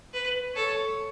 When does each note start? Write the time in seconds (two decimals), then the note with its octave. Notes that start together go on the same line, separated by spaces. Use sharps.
0.13 B4
0.55 A4 C#5